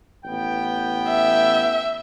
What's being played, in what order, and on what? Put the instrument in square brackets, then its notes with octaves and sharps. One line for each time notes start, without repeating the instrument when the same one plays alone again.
[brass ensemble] A1 B3 G5
[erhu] E5